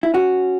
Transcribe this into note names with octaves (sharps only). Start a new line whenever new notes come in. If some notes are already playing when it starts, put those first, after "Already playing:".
E4
C#4 F#4